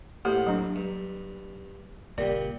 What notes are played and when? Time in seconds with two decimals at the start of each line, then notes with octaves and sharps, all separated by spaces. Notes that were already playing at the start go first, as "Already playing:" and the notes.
0.25 A2 A#3 G4 C5
0.47 F#3 D4
0.76 G2
2.18 F#1 A#2 G3 D5